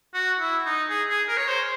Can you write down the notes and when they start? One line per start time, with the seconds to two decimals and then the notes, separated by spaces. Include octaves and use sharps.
0.14 F#4
0.40 E4
0.65 D#4
0.90 G#4
1.09 G#4
1.28 A#4
1.37 C#5
1.48 C5